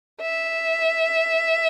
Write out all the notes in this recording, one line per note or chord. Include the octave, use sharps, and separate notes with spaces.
E5